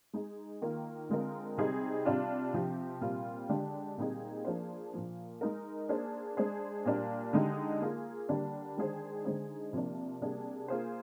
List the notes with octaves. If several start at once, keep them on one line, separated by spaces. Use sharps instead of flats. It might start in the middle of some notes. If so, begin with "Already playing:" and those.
G#3 D#4 G#4
D#3 A#3 F4 A#4
D3 G#3 C4 F4 A#4
C3 G3 C4 D#4 G#4
C3 G3 D4 F4
C3 F3 C4 G4
A#2 G3 C4 F4
D3 G#3 D4 G4
A#2 G3 C4 D#4 G#4
F3 A#3 D4 G#4 C5
A#2 F3 A#3
G#3 D#4 A#4
A#3 D4 G#4 C5
G#3 D4 G#4 C5
A#2 G3 A#3 D4
D3 G#3 D#4 G4
A#3 F4 G#4
D3 G3 A#3 D4
D#3 G#3 D4 G#4 C5
D3 G#3 D#4 G#4 C5
C3 F3 A#3 D4
C3 G3 A#3 D4 G#4
A#3 F4 G#4 C5